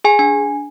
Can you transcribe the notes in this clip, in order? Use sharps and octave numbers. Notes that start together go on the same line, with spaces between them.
G#4 G#5
D4 G#5